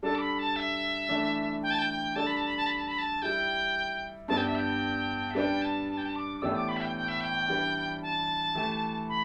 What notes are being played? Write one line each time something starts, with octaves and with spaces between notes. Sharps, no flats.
G3 D4 A4 A5
D6
B5
A5
E5
E3 A3 D4
G5
A5
G5
G5
G3 D4 A4 D5 A5
B5
A5
B5
A5
B5
A5
B5
A5
G3 E4 G4 G5
G2 G3 B3 D4 A5
G5
E5
G5
E5
G3 D4 B4 D5 G5
A5
A5
G5
A5
D6
D6
A2 E3 B3 G4 D5 E6
D6
B5
E5
G5
G5
E5
G5
E3 G3 D4 G4 B4
A5
E3 A3 G4
B5